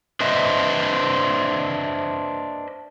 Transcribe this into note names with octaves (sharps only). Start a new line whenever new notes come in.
D4 B4 C5 D#5 E5